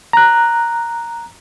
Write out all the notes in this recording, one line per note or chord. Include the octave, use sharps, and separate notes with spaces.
A#5 F#6